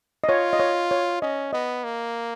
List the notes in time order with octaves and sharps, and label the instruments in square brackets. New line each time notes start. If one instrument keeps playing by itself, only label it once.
[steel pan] D#5
[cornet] F4 [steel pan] C#5
[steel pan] D#5
C#5
C#5
[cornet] C#4 [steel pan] D#5
[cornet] B3 [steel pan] D#5
[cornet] A#3